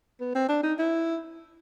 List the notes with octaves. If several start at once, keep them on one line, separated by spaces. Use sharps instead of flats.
B3
C4
D4
D#4
E4